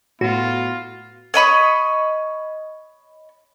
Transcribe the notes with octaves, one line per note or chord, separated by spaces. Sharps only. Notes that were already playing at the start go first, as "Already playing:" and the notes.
A2 B3 F4 F#4
C#5 D#5 B5 C#6